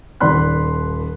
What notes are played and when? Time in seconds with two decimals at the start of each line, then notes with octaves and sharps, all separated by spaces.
0.20 D#1 D#2 D5 B5 C6 F#6